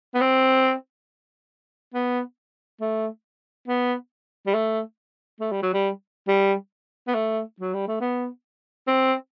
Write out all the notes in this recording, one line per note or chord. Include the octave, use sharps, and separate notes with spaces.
B3
C4
B3
A3
B3
G3
A3
A3
G3
F#3
G3
G3
B3
A3
F#3
G3
A3
B3
C4